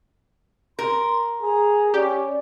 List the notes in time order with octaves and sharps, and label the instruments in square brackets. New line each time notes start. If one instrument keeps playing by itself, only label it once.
[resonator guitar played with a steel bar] A#4 [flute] C6
[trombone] G#4 [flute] A#5
[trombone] C#4 [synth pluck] G4 [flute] D5